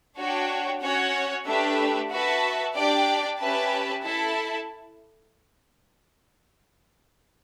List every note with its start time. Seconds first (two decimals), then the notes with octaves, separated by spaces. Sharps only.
0.17 D4 F#4 C#5 G5
0.81 C#4 F#4 C#5 F#5
1.46 A3 D4 G4 B4 E5
2.11 F#4 B4 E5 A5
2.75 D4 G4 D5 G5
3.39 C#4 G4 B4 E5 A5
4.03 E4 A4 E5 A5